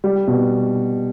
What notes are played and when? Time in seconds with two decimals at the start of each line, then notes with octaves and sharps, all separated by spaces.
0.04 G3
0.28 B2